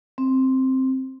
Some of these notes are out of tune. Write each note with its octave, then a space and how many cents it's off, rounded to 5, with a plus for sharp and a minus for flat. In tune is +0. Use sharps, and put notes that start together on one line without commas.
C4 +5